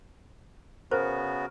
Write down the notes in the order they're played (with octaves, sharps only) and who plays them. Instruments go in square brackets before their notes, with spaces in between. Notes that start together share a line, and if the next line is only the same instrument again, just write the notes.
[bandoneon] C#3 B3 F#4 [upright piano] A#4 [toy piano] C5